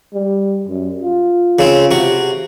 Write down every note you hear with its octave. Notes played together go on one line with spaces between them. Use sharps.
G3
F#2
F4
C#3 C4
C3 F#4